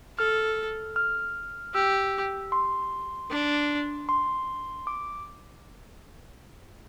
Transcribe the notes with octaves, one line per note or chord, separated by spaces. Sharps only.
A4 F6
F6
G4 E6
C6
D4
C6
D6